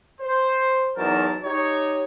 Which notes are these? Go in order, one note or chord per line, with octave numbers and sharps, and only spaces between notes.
C5
E2 F#3 D#4 A#4 A5
D#4 G4 C#5